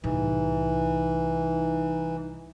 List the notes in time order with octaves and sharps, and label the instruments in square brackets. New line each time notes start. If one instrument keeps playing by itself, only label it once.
[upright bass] C2 A2 [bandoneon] E3 [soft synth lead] D#4